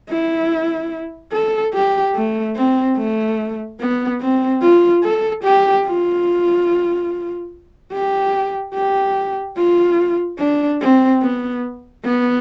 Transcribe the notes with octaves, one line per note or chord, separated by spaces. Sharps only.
E4
A4
G4
A3
C4
A3
B3
C4
F4
A4
G4
F4
G4
G4
F4
D4
C4
B3
B3